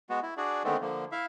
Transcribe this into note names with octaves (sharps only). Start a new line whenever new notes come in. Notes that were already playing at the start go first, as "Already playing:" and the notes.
G#3 B3 F#4
E4
D4 F#4 G#4 D5
D3 D#3 G#3 A3 B3 C4
D3 F3 A#3
E4 E5 F5